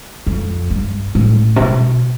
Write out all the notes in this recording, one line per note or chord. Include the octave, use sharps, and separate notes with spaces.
F2
G2
A2
C3
B2